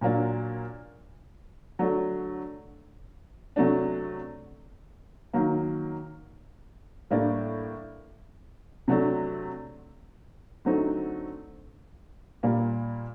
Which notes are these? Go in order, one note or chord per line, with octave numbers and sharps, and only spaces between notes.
A#2 F#3 A#3 D4
D3 F#3 A3 D4
C3 F#3 A3 D4
D#3 F#3 A#3
A2 G3 A#3 D4
C3 F#3 A3 D4
D3 F#3 A3 C4 D#4
A#2 G3 A#3